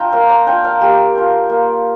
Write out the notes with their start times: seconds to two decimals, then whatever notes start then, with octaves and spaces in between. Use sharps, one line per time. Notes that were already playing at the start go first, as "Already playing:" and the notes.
Already playing: D4 F4 G5 A#5
0.12 A#3 F5
0.29 A#5
0.47 D4 F4 G5
0.64 F5
0.80 A#3 G4
1.15 D4 F4
1.49 A#3